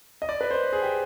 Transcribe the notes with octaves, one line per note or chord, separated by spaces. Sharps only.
D#5
D5
B4
C5
G#4
G4